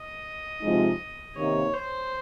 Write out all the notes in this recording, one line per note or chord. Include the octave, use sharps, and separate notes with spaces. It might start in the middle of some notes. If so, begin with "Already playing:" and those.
Already playing: D#5
C3 F3 G#3 D#4
C3 D#3 A#3 D#4 C#5
C5